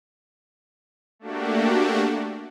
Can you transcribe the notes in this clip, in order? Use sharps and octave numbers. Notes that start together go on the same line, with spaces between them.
A3 A#3 D4 F#4 G4